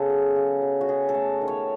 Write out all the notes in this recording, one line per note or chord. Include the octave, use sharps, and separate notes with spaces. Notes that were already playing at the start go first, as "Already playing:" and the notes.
Already playing: C#3 B3 A4
F#3
C#3
F#3
F#4
C#4 G#4
A4
A3
D#3
C#5